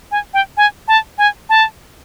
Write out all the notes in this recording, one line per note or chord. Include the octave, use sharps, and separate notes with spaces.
G#5
G5
G#5
A5
G#5
A5